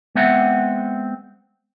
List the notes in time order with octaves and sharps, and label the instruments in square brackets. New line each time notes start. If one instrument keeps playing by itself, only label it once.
[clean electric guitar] G#3 B3 C4 E5 F#5